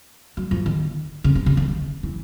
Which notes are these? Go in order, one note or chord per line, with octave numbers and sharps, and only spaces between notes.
F#3
F3
D#3
C#3
C3
C#3
D#3
E3